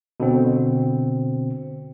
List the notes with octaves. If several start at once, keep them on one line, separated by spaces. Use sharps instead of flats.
B2 D3 C4